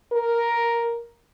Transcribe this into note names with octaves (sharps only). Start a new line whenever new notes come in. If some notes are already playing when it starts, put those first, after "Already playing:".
A#4